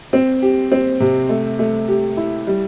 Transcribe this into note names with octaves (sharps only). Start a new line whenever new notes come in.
C4
G4
C4
C3
A3
A3
G4
E4
G3